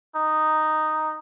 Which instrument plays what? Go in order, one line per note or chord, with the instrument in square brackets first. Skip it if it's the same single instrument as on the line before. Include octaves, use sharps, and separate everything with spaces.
[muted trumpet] D#4